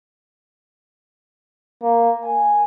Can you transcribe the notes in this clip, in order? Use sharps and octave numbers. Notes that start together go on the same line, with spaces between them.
A#3
G#5